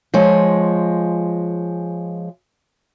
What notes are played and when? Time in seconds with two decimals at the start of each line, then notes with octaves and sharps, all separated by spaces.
0.14 F3 G#3 C#5